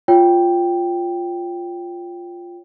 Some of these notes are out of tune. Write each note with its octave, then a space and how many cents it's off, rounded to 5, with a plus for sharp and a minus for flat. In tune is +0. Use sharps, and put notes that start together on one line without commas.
F4 +0 C#5 +0 G5 +0